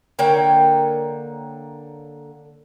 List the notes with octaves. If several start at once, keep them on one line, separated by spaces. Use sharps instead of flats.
D3 A#3 C#5 G5